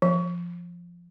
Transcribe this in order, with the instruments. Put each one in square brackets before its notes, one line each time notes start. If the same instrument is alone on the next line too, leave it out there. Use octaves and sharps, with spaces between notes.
[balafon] F3